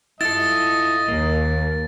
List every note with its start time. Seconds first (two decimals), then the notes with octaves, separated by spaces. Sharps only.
0.21 G2 E4 F4 A4 D#5 A6
1.08 D#2 A#3